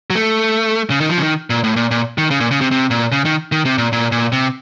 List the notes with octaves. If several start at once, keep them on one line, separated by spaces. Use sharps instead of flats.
F#3
A3
C#3
D#3
F3
C#3
D#3
A#2
A2
A#2
A#2
D#3
C#3
A#2
C#3
C3
C3
A#2
C#3
D#3
D#3
C3
A#2
A#2
A#2
C3